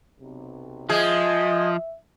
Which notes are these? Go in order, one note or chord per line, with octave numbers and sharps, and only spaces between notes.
B1 C3
F3 G#3 G#4 D#5 E5